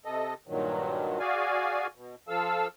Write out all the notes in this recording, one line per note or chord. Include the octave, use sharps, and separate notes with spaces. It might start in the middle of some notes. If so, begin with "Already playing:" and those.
C3 A4 D#5
G2 A#2 D#3 F#3
F#4 G#4 D5 F5 G#5
B2
F3 A4 F5 E6